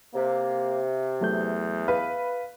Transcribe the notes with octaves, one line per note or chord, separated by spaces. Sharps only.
C3 A#3
E2 F#3 A3 G6
B4 F5